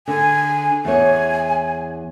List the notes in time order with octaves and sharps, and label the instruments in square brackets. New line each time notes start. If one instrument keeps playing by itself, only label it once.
[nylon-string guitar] D3 [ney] G#5
[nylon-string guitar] E2 C#5 [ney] G#5